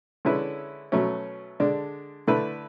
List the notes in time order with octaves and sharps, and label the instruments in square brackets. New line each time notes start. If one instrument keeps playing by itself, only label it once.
[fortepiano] D3 G#3 C#4 E4 B4
B2 F#3 A3 C#4
D3 G#3 D4
D3 A3 E4 B4